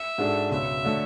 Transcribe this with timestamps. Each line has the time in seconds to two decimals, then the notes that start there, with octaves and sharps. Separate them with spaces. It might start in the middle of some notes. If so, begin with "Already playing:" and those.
Already playing: E5
0.18 G#2 G#3 D4 F#4 A4
0.51 C#2 B2 F#3 E5
0.84 D3 F#3 A3